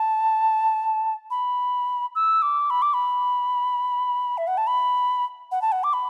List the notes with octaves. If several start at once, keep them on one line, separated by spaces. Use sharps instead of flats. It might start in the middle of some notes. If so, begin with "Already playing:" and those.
Already playing: A5
B5
E6
D6
B5
D6
B5
E5
F#5
A5
B5
F#5
A5
F#5
D6
B5